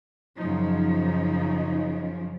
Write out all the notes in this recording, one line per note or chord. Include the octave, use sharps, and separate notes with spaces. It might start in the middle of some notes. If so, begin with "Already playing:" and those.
F#2 C#3 F3 D#4